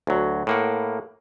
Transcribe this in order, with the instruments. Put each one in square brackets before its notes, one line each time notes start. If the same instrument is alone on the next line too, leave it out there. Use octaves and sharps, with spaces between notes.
[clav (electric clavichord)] D2 F#3
A2 A#3 F#5